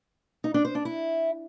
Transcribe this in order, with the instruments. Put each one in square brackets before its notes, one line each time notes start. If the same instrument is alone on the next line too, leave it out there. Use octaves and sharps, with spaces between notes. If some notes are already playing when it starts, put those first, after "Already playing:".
[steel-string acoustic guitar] D#4
D4
C5
D4
E4